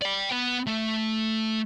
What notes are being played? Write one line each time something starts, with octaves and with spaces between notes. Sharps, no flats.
D5 G5
B3
A3